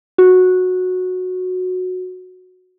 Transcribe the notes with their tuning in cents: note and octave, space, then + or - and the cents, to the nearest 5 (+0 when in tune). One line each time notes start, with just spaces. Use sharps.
F#4 -10